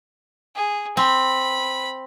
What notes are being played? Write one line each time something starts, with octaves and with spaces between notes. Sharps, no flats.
G#4
C4 B5